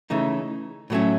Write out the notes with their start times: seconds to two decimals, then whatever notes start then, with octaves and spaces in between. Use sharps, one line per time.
0.10 C#3 E3 A3 D#4
0.90 A2 F#3 A3 C#4